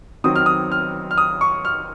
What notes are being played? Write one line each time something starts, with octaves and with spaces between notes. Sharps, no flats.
D#3 F#3 C4 D#6
F6
D#6
F6
F6
D#6
C#6
F6